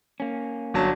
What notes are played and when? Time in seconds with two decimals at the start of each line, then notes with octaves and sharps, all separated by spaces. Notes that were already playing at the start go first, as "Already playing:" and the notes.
0.20 A#3 C#4
0.74 G1 F#3 A5